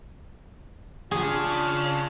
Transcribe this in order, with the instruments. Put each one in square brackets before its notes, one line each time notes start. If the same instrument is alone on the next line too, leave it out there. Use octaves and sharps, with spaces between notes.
[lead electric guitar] C#3 [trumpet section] D4 F4 [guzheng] G#4